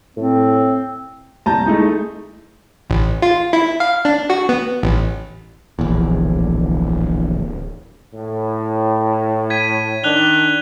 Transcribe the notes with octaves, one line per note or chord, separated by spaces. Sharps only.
A2 C4
C2 A5 A#5 G6
G#3 A3 D#4 E4
A1
F4
E4
F5
D4
F#4
B3
A1
D1 A#1 E2
A2
G#6 B6 D#7
D#3 D4 F#6 F7 G7